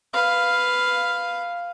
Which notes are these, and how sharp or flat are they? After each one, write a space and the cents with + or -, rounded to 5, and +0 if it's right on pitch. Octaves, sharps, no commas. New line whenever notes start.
B4 +10 F5 +0